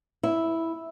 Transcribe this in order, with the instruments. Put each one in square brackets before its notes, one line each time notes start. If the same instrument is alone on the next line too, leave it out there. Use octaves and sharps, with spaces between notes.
[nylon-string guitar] E4